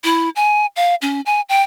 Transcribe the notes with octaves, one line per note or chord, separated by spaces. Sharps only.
E4
G#5
F5
C#4
G#5
G5